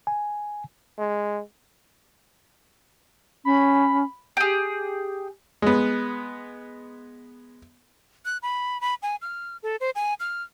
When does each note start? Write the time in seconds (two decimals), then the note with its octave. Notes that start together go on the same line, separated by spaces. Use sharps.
0.07 G#5
0.98 G#3
3.45 C#4 B5
4.37 G4 G#4
5.62 G#3 B3
8.25 F#6
8.42 B5
8.81 B5
9.02 G#5
9.22 F6
9.63 A4
9.81 C5
9.95 G#5
10.20 F6